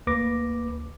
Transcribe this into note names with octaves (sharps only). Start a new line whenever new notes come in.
D2 A#3 B4 D6 A#6